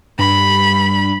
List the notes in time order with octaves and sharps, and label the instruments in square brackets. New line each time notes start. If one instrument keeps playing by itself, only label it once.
[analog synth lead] G2 [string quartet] B5